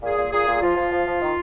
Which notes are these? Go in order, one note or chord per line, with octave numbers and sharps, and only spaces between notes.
A#2 G#4
A#2
A#2 G#4
A#2
F3 F4
F3
F3
F3
D#3